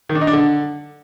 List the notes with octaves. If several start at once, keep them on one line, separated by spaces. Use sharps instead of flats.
D#3
D4
D#4
D4
D3